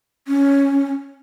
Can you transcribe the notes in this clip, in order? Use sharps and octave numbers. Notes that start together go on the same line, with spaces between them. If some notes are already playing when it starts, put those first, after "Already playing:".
C#4